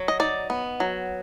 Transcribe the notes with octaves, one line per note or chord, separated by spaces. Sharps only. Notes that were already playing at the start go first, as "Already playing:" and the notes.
Already playing: F#3
D#5
D#4 D5
B3
F#3